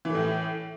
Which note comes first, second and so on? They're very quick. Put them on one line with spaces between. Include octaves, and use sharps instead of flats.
E3 A3 A2